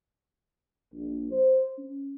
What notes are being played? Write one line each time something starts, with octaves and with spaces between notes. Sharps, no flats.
A#1
C5
C#4